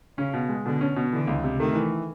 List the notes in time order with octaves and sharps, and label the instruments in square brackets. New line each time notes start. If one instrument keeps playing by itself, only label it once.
[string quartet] C#3 [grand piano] C#4
[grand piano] B2
G#3
[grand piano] B2 [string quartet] D3
[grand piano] C#4
B2
[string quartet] D3 [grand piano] E3
[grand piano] C#2
C3
[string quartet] D#3 [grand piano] A3
[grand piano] E3